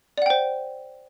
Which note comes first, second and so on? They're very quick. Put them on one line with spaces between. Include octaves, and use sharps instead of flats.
D5 F#5 G5 C5